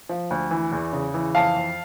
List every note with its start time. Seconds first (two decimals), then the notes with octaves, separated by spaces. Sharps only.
0.09 F3
0.30 D2
0.51 E3
0.72 E2
0.93 C#3
1.14 E3
1.35 F2 F5 A5
1.56 F2